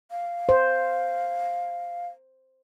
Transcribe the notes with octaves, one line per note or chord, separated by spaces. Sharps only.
F5
C5